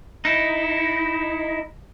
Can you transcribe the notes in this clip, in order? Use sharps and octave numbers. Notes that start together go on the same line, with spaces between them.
D#4 E4